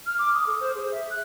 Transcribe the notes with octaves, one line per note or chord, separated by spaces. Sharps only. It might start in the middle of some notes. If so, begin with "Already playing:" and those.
F6
D6
D#6
A4
C5
G#4
E5
F#6